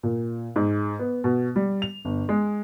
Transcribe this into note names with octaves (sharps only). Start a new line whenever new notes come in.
A#2
G#2
B3
B2
G3
F7
G1
G#3